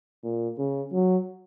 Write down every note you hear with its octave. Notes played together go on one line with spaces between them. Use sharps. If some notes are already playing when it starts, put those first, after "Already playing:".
A#2
C#3
F#3